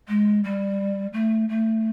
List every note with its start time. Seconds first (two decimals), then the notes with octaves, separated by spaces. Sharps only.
0.08 G#3
0.43 G3
1.13 A3
1.49 A3